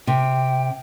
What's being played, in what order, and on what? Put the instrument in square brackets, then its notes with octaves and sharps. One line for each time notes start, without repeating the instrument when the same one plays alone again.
[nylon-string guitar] C3 [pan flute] G5